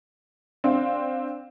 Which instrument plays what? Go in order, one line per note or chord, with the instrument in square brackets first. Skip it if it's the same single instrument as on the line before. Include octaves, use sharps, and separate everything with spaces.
[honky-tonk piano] C4 D4 F5